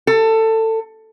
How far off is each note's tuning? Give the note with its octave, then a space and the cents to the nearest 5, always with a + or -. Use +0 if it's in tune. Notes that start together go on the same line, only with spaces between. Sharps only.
A4 +20